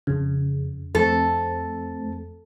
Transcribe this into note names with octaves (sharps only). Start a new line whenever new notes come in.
F2 C#3
F2 A3 C4 A4